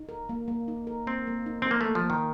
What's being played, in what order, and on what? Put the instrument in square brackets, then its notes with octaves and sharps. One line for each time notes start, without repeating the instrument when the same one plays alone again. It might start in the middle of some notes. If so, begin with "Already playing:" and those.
Already playing: [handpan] D#4
A#4
A#3
A#3
D#4
A#4
[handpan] A#3 [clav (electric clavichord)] C4
[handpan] A#3
D#4
[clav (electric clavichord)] C4
[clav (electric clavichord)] A#3 [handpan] A#4
[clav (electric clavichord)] A3 [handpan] A#3
[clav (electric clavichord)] F3
[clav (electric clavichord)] D#3 [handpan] A#3